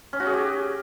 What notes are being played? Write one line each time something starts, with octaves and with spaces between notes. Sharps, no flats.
C#4
F#4
G#4
G4